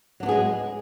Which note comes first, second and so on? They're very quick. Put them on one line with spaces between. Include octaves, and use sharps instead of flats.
F#3 D4 B3 G#4 G#3